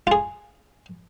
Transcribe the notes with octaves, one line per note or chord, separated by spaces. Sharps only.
F4 G#4